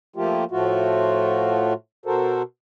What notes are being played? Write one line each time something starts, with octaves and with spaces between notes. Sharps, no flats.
F3 A3 A#3 F4 G4
A2 F3 A3 F4 F#4
B2 F#4 A4 A#4 C5